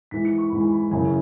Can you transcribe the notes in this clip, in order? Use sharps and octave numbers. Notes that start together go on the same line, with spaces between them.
G#2 E3 B6
C#7
C#6
G#2 E3 B5
G#5
B5
F#2 C#3 E3 G#5